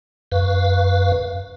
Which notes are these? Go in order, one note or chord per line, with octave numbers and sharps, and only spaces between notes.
F#2 B4 F5